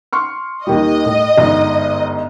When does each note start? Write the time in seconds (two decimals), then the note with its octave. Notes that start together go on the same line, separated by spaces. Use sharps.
0.13 C6 C#6 F6
0.67 D#2 D#3 G3 D#5
1.05 A2
1.37 G1 G#2